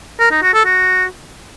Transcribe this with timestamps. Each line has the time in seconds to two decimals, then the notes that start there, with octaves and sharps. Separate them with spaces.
0.19 A#4
0.31 D#4
0.42 F#4
0.54 A4
0.65 F#4